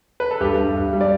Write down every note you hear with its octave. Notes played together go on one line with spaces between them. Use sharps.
B4
A4
G2 G4
G2
G2
G3
D5